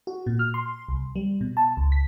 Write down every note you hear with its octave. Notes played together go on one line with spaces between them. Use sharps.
F#4
A#2
F6
C6
C2
G3
B2
A5
C#2
B6